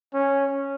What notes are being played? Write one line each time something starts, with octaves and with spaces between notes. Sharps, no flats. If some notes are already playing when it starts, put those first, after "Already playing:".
C#4